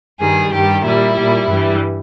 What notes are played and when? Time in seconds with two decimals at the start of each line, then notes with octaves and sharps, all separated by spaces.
0.21 G2 D#3 G3 G#4
0.53 G2 D#3 G3 G4
0.85 A#2 G3 E4
1.17 A#2 G3
1.49 G2 E3 G3